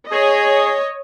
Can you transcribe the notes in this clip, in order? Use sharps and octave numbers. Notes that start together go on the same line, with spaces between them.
G#4 C#5 D#5